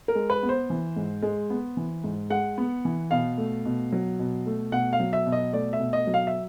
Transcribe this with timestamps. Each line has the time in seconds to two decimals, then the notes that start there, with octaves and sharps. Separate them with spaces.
0.08 A#4
0.15 G#3
0.30 B4
0.43 B3
0.49 C5
0.70 E3
0.96 G#2
1.23 G#3
1.50 B3
1.77 E3
2.04 G#2
2.30 G#3 F#5
2.58 B3
2.85 E3
3.11 B2 F5
3.38 A3
3.65 B2
3.93 F#3
4.19 B2
4.46 A3
4.72 B2 F#5
4.93 F5
5.00 F#3
5.13 E5
5.26 B2
5.32 D#5
5.53 A3 D5
5.73 E5
5.80 B2
5.93 D#5
6.07 F#3
6.14 F5
6.27 E5